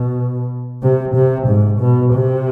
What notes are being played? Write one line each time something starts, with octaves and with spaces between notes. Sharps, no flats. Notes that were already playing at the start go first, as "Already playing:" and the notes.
Already playing: B2
C3
C3
G#2
B2
C3